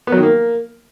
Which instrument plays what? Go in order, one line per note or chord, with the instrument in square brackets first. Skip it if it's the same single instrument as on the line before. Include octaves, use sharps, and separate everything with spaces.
[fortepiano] B3
F#3
D#3
A#3